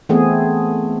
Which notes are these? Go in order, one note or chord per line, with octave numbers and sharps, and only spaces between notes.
E3 A3 B3 C4 G#4